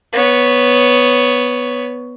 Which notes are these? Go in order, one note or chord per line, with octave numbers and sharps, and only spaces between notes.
B3 C#5